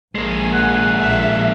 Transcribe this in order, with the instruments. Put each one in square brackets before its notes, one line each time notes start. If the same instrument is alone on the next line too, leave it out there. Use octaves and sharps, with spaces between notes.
[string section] A#1 G#5 [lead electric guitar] G#3 A#3
[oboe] F#5
[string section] A#1 E5